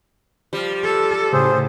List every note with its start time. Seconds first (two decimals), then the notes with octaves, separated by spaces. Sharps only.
0.53 F3 G3
0.83 A4
1.33 A2 C#3 G#4 C5